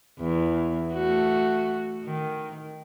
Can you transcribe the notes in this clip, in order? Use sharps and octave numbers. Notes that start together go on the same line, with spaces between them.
E2
A3 F#4
D#3